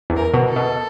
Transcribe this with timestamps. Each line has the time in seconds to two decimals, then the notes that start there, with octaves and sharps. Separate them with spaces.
0.10 E2
0.17 A#4
0.34 B2
0.49 A4
0.56 B2